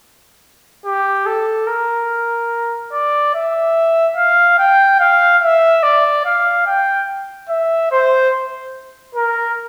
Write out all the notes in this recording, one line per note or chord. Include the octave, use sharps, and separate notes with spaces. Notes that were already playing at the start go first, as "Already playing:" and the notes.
G4
A4
A#4
D5
E5
F5
G5
F5
E5
D5
F5
G5
E5
C5
A#4